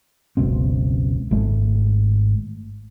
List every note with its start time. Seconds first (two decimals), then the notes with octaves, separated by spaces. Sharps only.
0.37 F#1 C#2 B2 C4
1.31 G#1 G#2 G#3 A3